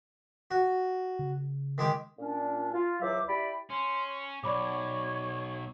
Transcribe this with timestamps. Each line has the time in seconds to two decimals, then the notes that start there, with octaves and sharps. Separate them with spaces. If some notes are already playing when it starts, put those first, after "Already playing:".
0.51 F#4
1.19 C#3
1.78 D#3 G#3 G4
2.18 A#2 C#4 D4
2.74 F4
3.01 C#2 E3 F#3 C5 E5 D6
3.28 E4 G4 D5 B5
3.70 C#4 C6
4.43 B1 C#5 D5 B5 D6